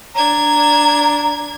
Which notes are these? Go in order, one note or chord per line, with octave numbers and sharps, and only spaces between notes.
D4 A#5 G#6